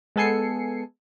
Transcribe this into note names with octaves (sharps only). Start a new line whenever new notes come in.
G#3 B3 A4 G#5 C7 C#7